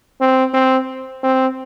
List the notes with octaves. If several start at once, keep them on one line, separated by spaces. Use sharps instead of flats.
C4
C4
C4